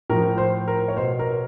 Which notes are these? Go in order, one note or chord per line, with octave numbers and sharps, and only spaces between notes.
A2 F3 A#4
C5
A#4
C#5
B2 C5
A#4